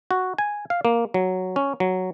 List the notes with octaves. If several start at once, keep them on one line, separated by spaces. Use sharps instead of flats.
F#4
G#5
F5
A#3
F#3
C#4
F#3